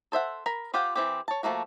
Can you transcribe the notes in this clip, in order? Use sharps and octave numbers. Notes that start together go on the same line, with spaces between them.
A4 C5 E5 F#5
A#4 B5
F4 G4 C5 F5 F#5
E3 C4 G4
C#5 A5
F3 A3 A#3 F#4